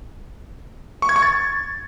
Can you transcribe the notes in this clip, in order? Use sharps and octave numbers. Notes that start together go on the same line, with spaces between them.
C#6
G#6
C#6
A6